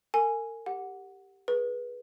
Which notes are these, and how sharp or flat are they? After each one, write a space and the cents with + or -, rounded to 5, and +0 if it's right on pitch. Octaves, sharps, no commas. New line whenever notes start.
A#4 -40 G#5 +0
G4 +0 F#5 -5
G#4 +0 B4 -20